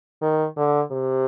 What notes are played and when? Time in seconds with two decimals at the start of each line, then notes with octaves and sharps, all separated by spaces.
0.22 D#3
0.57 D3
0.91 C3